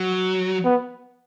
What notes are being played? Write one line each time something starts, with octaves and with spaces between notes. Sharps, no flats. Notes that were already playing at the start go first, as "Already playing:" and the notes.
Already playing: F#3
B3